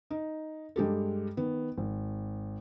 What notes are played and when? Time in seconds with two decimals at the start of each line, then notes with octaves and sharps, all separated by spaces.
0.10 D#4
0.76 G2 G#3 G4 A4
1.37 D#3 B3
1.78 G#1